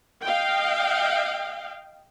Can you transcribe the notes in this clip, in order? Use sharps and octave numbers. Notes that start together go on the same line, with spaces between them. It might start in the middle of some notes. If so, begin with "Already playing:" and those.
D#5 F5 G5